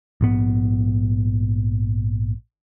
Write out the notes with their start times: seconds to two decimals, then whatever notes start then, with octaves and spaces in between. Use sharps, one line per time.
0.21 A#1 G#2 B3